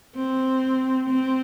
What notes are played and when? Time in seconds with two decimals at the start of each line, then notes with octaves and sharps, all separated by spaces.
0.16 C4
1.09 C4